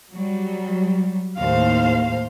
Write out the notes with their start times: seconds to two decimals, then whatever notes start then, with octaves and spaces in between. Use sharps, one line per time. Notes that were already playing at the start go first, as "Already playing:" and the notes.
0.13 F#3 G3
1.39 D#2 A2 C5 F5